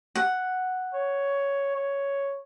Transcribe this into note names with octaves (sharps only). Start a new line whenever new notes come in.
F#5
C#5
C#5